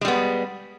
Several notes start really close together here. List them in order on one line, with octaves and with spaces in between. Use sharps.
G#3 G3 B3